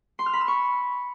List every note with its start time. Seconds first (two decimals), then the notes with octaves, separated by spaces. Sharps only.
0.19 C6
0.26 F6
0.33 B5
0.41 E6
0.48 C#6